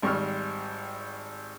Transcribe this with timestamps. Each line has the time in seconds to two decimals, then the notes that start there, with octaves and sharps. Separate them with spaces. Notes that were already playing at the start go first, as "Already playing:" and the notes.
0.03 G#1 G3 C#6 E6 F6